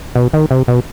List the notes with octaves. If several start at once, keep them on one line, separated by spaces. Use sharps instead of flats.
B2
D#3
C3
B2